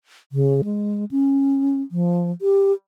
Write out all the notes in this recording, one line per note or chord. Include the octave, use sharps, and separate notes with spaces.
C#3
G#3
C#4
F3
G4